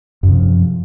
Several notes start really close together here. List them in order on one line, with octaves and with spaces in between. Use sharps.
F#2 C3 F3